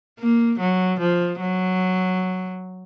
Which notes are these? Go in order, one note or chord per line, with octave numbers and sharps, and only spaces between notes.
A#3
F#3
F3
F#3